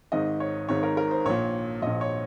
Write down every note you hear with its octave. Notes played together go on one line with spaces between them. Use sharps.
G#1 G#2 D#3 D#5
C#5
G#1 G#2 D#3 C#5
A#4
A#4
C5
A#1 A#2 C#5
A#1 A#2 D#5
C#5